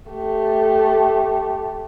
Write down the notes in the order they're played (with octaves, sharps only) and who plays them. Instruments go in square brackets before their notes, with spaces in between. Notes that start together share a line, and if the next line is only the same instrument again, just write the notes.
[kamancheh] A3 G4